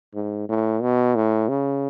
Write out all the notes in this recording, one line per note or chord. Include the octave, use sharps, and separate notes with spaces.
G#2
A2
B2
A2
C#3